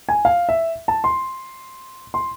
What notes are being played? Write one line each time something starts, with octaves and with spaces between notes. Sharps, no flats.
G#5
F5
E5
A5
C6
C6